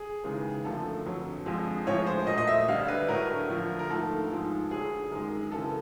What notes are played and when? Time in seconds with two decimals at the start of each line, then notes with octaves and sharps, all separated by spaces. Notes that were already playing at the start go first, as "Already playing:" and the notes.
Already playing: G#4
0.24 D#2 C#3 E3 G#3
0.64 F#2 D3 F3 A3 A4
1.05 F2 D3 F#3
1.46 F2 D3 F3 G#3
1.86 A2 F3 G#3 C#5
2.07 C5
2.27 A#2 F#3 A3 D#5
2.38 D#5
2.47 E5
2.68 D2 D3 G3 F5
2.88 B4
3.08 A2 F#3 A3 A#4
3.49 D2 D3 F3
3.79 A#4
3.90 G#2 F3 A3 A4
4.31 G#2 F3 G#3
4.71 D2 D3 F#3 G#4
5.11 F#2 D#3 G#3
5.52 F#2 C#3 E3 A4